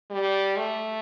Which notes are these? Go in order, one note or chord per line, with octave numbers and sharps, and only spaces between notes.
G3
A3